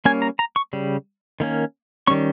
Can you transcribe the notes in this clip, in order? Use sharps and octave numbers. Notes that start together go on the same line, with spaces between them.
G3 A#3 C#4 G#5
A#5
A#5
C#6
C#3 G3
D#3 A#3 C#4
D#3 G3 C#4 C#6